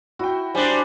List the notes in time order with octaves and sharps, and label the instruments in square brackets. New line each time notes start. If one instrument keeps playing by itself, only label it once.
[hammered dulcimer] E4 [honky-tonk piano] F#4 G5
[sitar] G3 D4 [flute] C5 [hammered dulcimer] G#5